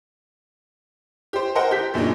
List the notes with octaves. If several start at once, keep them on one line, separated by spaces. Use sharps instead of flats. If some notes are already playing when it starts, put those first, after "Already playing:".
G4 C5
A#4 C5 D#5 F#5 G5
G4 G6 B6
F#2 A#2 C#3 D4 D#4